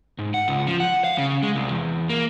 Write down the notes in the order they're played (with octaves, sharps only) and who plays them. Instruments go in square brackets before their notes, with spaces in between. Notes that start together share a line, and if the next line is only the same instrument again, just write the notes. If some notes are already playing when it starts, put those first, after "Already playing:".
[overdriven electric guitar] G#2
F#5
C#2
F3
F#5
F5
C#3
G#3
C2
E2
A#3